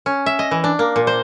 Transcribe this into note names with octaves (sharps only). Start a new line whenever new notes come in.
C#4
E5
D#5
E3
D4
A#3
A#2
C5